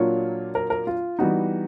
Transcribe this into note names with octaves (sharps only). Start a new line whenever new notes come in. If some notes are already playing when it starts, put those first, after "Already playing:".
Already playing: A#2 F#3 A#3 D4 F4 C#5
A#4
A#4
F4
E3 G3 B3 D#4 F#4